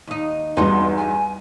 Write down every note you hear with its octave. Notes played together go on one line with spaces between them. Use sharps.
D#2 D#4
E2 G2 D#4 F#4 C6
G#5